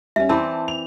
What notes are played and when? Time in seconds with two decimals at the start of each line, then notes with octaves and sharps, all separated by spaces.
0.16 G3 C#4 E5
0.29 E3 C4 D5 A5 C6
0.68 F7